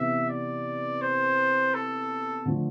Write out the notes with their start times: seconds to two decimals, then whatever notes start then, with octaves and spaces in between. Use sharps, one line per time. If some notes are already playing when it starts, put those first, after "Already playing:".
Already playing: C3 E3 B3 E5
0.29 D5
1.01 C5
1.74 A4
2.45 D3 F3 A3